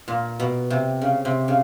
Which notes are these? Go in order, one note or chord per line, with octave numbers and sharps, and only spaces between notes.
A#2
B2
C3
C#3
C3
C#3